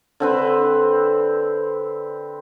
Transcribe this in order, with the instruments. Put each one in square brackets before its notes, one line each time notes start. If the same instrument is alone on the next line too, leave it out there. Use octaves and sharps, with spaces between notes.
[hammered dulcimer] D3 C4 B4